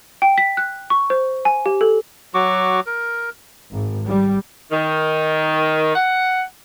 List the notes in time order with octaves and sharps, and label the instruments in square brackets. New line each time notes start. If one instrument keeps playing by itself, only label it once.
[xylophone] G5
B6
F#6
C#6
C5
G#5
G4
A4
[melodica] F#3 F#4 C#6 D6
A#4
[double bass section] G#1
G3
[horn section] D#3
F#5